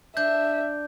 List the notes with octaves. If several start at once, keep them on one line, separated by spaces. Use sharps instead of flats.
D4 E5 G6